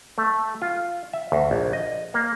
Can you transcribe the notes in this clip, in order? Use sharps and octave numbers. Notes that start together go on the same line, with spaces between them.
A3
F4
E5
D2
A#1
D#5
A#3